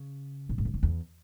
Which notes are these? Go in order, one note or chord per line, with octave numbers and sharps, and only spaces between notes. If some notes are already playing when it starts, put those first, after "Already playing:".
Already playing: C#3
B2
A2
G#2
F#2
E2